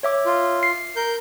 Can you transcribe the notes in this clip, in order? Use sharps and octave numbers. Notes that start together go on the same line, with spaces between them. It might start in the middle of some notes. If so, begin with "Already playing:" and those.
C#5 E5 D6
F4
C7
A#4 G6